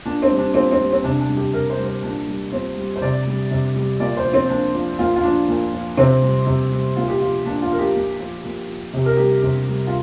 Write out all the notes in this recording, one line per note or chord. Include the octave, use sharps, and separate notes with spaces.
A#2 D4
C4
G3
D4
A#2 C4
C4
G3
C4
C3 D4
D4
G3
G4
C3 A#4
C5
G3
C5
A#2 D4
G3
A#2 C4
G3
C5
C3 D5
G3
C3
G3
A#2 D5
C5
F3
C4
A#2 D4
F3
A#2 F4
F4
F3 D4
A#2
F3
C3 C4
G3
C3
G3
A#2 F4
G4
F3 F4
A#2 D4
F4
F3 A#4
G4
A#2
F3
A#2
F3
C3 G4
A#4
G3 G4
C3
G3
F4